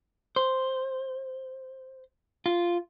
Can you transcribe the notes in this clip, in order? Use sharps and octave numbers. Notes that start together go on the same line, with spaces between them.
C5
F4